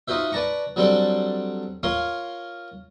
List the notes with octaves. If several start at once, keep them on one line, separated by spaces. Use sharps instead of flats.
D#4 F4 F#4 C5 E5
B4 D5 A5 A#5 C#6
F#3 G3 C4 D4 A4 C5
F4 A#4 C#5 F5 C6